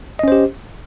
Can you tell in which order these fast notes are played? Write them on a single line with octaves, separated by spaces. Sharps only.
D#5 C#4 C5 G4